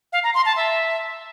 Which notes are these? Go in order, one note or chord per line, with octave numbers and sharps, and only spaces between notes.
F5
A#5
C6
A5
E5